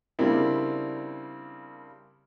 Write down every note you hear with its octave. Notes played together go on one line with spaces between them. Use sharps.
C#3 G3 A#3 C4 D4 E4